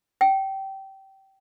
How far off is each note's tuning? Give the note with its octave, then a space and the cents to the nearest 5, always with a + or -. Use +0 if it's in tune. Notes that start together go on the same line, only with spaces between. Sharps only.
G5 -20